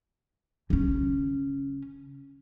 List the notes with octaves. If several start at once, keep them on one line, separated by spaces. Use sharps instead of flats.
C#3 C#4